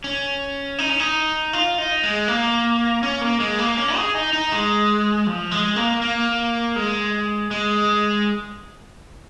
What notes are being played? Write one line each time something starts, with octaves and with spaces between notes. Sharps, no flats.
C#4
D#4
C#4
D#4
F4
D#4
G#3
A#3
C#4
A#3
G#3
A#3
C#4
G#4
D#4
D#4
G#3
F3
G#3
A#3
A#3
G#3
G#3